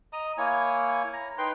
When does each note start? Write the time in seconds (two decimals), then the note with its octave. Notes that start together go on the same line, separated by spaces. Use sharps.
0.13 D#5 A#5 D#6
0.38 A#3 E4 C#5 G#5
1.13 A#5
1.38 D#4 B4 G5 C6